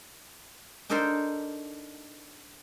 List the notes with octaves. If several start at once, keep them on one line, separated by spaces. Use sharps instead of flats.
D4 D#4 A4 A#4 C5 G5